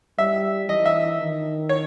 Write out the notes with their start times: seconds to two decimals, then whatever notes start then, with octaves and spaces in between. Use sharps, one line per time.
0.18 G3 E5
0.69 E3 D#5
0.86 E5
1.20 D#3
1.69 C#5